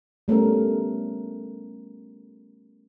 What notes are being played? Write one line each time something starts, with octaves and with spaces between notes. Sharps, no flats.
G3 A3 B3 C#4 A#4